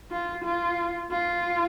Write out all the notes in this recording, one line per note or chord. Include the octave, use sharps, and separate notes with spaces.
F4
F4
F4